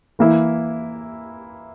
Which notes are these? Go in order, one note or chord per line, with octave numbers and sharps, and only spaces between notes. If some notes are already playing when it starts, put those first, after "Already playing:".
E3 A#3 E4